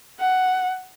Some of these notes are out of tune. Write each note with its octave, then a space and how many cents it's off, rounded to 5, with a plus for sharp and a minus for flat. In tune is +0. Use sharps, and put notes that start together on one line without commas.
F#5 +10